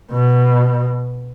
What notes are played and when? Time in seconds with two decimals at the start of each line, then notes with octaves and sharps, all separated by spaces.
0.12 B2